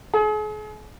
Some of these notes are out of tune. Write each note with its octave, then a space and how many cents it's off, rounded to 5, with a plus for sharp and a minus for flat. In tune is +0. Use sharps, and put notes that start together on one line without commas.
G#4 +40